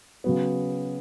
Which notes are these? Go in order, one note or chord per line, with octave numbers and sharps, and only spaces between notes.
C#3 F#3 B3